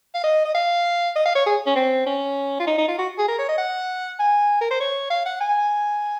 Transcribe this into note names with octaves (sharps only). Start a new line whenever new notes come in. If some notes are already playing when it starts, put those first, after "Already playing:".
F5
D#5
D#5
F5
D#5
F5
C#5
G#4
C#4
C4
C#4
F4
D#4
D#4
F4
F#4
G#4
A#4
C#5
D#5
F#5
G#5
A#4
C5
C#5
F5
F#5
G#5